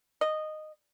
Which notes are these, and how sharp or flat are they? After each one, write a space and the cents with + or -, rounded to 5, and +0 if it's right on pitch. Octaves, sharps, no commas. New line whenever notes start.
D#5 -10